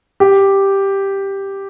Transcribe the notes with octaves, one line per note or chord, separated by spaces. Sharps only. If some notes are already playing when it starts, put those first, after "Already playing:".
G4